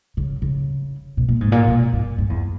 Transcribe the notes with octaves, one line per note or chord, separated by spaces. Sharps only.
C#3
C#3
B2
A#2
G#2
A#2
B2
G2
G2
E2